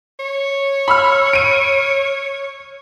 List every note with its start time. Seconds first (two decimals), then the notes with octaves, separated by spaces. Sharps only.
0.19 C#5
0.88 B5 E6 F6
1.33 D7 D#7